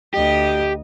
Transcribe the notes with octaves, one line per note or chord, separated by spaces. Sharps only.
D2 G4 D#5